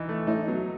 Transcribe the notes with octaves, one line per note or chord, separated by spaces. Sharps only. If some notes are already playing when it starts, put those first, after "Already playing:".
Already playing: E3 D#4
A3
A2 D#4
B2 F#3